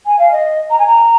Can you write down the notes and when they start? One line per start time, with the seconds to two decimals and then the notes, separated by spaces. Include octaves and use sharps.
0.06 G#5
0.19 F5
0.32 D#5
0.70 A#5
0.79 G#5
0.87 A#5